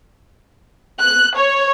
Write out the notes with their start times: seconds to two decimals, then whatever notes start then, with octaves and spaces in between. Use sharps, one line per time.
1.00 F#6
1.37 C#5